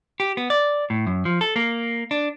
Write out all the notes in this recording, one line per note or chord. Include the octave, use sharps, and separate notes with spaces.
G4
B3
D5
A2
F#2
F3
A4
A#3
D4